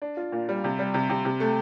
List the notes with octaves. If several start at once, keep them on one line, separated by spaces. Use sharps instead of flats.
D4
F4
A#2
G3
C3
G3
C3
C3
C3
A3